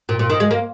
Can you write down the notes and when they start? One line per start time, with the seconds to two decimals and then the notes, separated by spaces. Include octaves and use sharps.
0.09 A#2
0.19 A#2
0.30 D#3
0.40 G#3
0.51 A#3